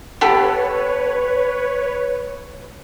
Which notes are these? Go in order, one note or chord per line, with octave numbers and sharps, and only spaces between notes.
B3 G4 A4 B4 C#5